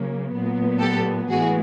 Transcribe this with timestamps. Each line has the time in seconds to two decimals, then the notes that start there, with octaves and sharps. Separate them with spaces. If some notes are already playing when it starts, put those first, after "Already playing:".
Already playing: C#3 F#3 A#3
0.31 A#2 F#3 B3
0.79 G4 A4
1.29 A2 E3 G#3 B3 F#4 G#4